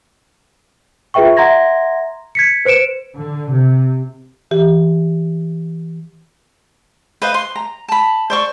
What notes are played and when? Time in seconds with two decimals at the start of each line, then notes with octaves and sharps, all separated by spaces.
1.14 F4 G#4 B4 E5 G5 C#6
1.37 E5 F#5 A#5 C6 G#6 A#6
2.35 G#6 B6 C#7
2.65 B4 C5 C#7 D7 E7
3.15 D3
3.52 C3
4.51 E3 G4
7.22 B4 C5 D#5 F5
7.34 C6
7.56 A#5
7.88 A5 B5
8.30 C5 D5 C#6